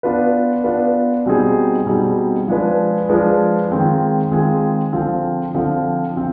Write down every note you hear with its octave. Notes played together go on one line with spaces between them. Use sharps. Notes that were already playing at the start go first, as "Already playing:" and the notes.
B3 D4 F4 B4
B3 D4 F4 B4
B2 G3 C4 D#4 G#4
B2 G3 C4 D#4 G#4
F3 G#3 D4 G#4 B4
F3 G#3 D4 G#4 B4
D#3 G#3 C4 F4 G#4
D#3 G#3 C4 F4 G#4
D3 F3 C4 F4
D3 F3 C4 F4
C4 F4